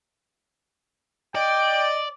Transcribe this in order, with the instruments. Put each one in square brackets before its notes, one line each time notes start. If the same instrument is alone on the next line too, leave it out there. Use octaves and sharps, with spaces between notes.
[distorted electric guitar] D5 [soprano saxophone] D#5 [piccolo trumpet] G5